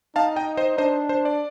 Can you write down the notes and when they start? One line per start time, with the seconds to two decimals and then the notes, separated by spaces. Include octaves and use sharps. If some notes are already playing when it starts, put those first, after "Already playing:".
0.16 D#4 F5 A5
0.36 D#5 G5
0.57 C5 D#5
0.78 D4 C5 D#5
1.09 C5
1.25 D5